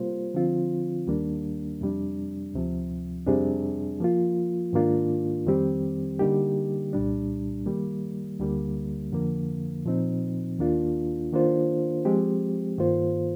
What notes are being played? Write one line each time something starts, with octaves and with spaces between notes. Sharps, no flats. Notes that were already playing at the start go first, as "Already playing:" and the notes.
Already playing: C3 G3 A#3 F4 C5
D3 F3 C4 F4
D#2 D#3 G3 A#3 D4
F2 C3 G3 D4
D2 C3 F3
F2 C3 G3 D4 G#4
F3 A#3 F4
G#2 D#3 A#3 D4 F4
F2 D#3 G3 C4 G4
D3 G3 A#3 D#4 G4
C2 A#2 G3 D4
D#3 G3 A#3
D2 D3 G3 A#3
F2 D3 F3 A#3
A#2 F3 C4 D#4
D#2 D#3 A#3 D4 F4
D#3 A#3 D4 F4 C5
F3 G#3 C4 G4
G2 D#3 A#3 F4 C5